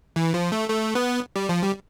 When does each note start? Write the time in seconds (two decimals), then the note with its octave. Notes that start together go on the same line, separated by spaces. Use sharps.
0.16 E3
0.34 F3
0.52 A3
0.69 A3
0.95 B3
1.36 G3
1.49 F3
1.62 G3